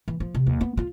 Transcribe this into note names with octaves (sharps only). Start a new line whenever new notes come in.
E3
F3
C3
D#2
B3
F4